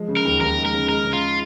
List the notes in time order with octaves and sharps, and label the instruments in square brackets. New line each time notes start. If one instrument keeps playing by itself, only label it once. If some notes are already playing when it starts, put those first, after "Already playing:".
Already playing: [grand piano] F3 G#3
C#3
[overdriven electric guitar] A#4
[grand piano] D#2
[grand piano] D#2 [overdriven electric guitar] A#4
[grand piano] G#3
[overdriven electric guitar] A#4
[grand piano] C#3
[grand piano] G#3 [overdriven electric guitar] A#4
[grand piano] C#3
[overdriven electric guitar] F4